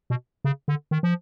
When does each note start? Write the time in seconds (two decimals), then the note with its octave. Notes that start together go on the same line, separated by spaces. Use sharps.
0.10 B2
0.45 C#3
0.68 D3
0.91 D#3
1.03 F3